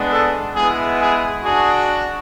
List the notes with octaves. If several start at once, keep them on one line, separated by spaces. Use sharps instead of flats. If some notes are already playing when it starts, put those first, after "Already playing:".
Already playing: G#3 B3 D4
A4
G#3 B3 E4 G#4
G#4
D4 F#4 G#4